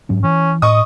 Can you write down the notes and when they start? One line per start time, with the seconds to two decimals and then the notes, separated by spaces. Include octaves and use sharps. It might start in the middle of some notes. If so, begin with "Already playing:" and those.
0.09 G#2 F#3 C#4
0.23 E3 C#4
0.62 A2 D#5 C#6 D#6